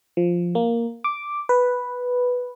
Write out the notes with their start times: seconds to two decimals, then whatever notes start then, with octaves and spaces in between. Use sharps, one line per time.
0.17 F3
0.55 A#3
1.04 D6
1.49 B4